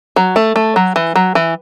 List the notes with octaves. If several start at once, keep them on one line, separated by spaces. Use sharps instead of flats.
F#3
A3
A3
F#3
E3
F#3
E3